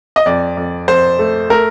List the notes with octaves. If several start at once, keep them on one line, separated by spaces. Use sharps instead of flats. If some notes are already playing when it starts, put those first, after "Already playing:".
D#5
F2 D5
F2
F2 C5
A3
A3 A#4